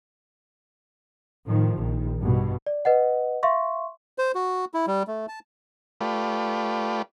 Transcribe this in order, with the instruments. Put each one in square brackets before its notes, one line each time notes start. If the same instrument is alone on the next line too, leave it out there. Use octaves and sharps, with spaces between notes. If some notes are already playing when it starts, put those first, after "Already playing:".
[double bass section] A2 D#3 F3
A#1 D#3
G2 B2
[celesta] D5
B4 D#5 F#5
E5 F5 C6 C#6
[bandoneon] C5
F#4
E4
G3
A3
A5
[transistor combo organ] A3 F4 G4 B4 D5